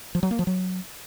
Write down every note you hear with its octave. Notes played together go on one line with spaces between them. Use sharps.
F3
F#3
A#3
F3
F#3